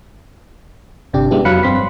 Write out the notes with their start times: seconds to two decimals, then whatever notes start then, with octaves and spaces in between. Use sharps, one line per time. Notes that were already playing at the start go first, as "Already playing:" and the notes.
1.13 G1 C3 D4 G4
1.31 G#3 B3 D4 E4 G4
1.45 F2 F#3 F5 B5 F#6 C#7
1.63 G2 C4 C6 B6